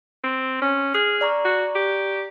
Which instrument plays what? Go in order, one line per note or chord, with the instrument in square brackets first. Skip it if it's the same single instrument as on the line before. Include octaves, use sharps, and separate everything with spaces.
[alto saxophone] C4
C#4
[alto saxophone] G#4 [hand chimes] F6 F#6
[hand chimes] D5 A#5 C#6
[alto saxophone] F#4
G4